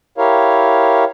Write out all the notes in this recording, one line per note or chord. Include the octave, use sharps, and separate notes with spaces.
E4 G4 A#4 C#5 F5